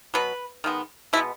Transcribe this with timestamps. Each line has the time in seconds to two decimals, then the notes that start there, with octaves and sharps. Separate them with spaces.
0.14 B2 F#3 B3 B4
0.64 D#3 G#3 B3
1.13 B2 G#3 B3 E4